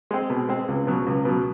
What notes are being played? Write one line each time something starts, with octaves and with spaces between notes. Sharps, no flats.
G#3 C4
B2
G#3 C4
C#2
B2 F#3
C#2
B2 F#3